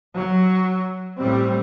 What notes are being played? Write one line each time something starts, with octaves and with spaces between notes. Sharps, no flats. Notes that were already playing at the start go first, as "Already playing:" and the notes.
F#3
A1 A2 G3 C4